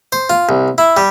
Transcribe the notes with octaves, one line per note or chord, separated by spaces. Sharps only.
C5
F4
C2
E4
G3